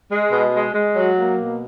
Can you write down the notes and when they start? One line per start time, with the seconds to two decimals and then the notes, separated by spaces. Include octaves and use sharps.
0.09 G#3
0.31 B2
0.53 G#3
0.74 G#3
0.96 F#3
1.18 A#3
1.39 B2